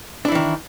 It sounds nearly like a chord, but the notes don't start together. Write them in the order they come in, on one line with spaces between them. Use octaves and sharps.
D4 E4 E3 D#3